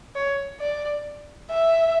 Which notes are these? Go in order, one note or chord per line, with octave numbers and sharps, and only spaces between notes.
C#5
D5
E5